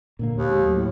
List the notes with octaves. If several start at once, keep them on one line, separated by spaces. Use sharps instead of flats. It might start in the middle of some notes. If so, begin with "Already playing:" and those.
A#2 D3 A#3
D#2
G#3
F#3 A3
A2